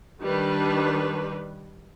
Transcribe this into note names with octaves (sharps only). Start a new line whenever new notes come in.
D#3 G3 D4 B4